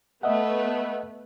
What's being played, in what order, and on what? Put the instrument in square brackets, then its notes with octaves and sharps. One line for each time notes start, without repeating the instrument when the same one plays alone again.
[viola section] A3 B3 B4 [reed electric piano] D#5 E5 F#5